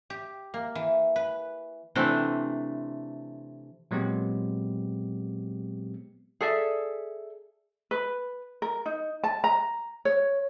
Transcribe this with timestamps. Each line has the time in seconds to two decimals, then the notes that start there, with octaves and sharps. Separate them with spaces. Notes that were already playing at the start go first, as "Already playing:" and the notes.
0.10 G4
0.54 A#3
0.75 E3
1.16 B4
1.95 C3 E3 A3 C4 D4
3.91 A#2 F#3 G#3 B3 C4 G4
6.41 G#4 A4 D5 E5
7.91 B4
8.62 A#4
8.86 D#4
9.24 A5
9.44 A#5
10.05 C#5